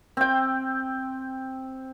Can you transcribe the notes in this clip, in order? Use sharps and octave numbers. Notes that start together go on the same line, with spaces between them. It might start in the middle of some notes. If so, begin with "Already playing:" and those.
C4 G5